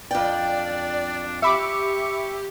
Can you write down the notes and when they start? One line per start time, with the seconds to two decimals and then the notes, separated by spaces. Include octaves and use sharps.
0.11 F2 D4 D5 G5
1.42 G4 E5 B5 C#6 D6